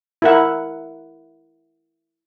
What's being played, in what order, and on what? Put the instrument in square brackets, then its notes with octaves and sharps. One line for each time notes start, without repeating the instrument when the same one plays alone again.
[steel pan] E4 A#4 F#5